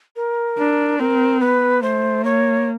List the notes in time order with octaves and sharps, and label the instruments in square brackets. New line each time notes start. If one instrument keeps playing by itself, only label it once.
[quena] A#4
[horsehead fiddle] D4
[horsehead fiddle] C4 [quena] A#4
[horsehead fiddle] B3 [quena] B4
[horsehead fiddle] A3 [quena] C5
[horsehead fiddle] A#3 [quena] C#5